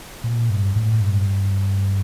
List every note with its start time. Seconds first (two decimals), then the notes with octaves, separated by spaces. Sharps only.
0.24 A#2
0.50 G2
0.76 A2
1.01 G2